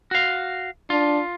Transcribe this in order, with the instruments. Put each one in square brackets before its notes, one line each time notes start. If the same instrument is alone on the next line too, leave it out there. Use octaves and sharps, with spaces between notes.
[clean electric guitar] F#4 F5
[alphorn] D4 [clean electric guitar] F4